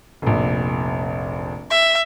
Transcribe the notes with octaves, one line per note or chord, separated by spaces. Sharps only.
F1 A#1
E5